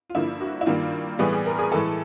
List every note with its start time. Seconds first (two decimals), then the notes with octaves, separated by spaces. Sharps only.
0.10 F4
0.15 G2 D3 F3 A#3 E4
0.41 F#4
0.61 E4
0.66 G2 D#3 G3 A#3 F4
1.19 A2 E3 G3 B3 G#4
1.32 G#4
1.46 A#4
1.59 G#4
1.72 A2 E3 G#3 A4